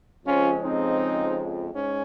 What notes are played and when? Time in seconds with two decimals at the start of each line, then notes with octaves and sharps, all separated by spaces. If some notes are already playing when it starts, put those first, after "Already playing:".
0.25 F2 C#3 F3 G#3 C4 C#4 F4
0.62 C4 D#4
1.73 G#2 C#4